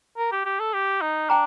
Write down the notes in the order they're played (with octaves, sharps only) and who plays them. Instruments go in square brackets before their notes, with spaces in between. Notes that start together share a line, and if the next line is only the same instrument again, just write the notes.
[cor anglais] A#4
G4
G4
A4
G4
D#4
[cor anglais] D4 [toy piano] G5 A#5